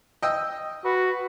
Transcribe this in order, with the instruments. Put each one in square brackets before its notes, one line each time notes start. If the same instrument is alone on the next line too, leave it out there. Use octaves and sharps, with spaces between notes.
[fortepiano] D#5 G5 E6
[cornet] F#4 [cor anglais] B4